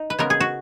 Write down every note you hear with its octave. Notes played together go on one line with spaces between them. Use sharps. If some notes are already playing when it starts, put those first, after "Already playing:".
Already playing: D#4
B4
C#3 G#3 B3 A#4
G#4
F#4